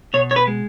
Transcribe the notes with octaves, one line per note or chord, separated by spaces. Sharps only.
B2 C#5
C#5
B4
G#3